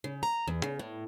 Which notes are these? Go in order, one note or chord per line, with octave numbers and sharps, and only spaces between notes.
C#3
A#5
E2
C#3
A2